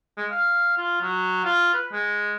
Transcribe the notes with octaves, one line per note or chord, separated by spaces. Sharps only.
G#3
F5
F4
F#3
F4
B4
G#3